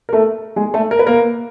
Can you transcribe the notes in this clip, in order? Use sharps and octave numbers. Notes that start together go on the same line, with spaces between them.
A#4
A3 A4
G#3 G#4
A3 A4
A#4
B4
A#3 A#4